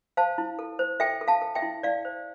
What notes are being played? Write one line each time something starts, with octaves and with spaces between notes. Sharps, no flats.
C5 F5 A5
E4
A4
C5
A4 E5 G5
A4
F5 A5
A4
E5 G5
E4
E4 D5 F5
C5